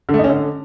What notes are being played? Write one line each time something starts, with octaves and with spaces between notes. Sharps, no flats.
D3
A3
D#4
C#4
D3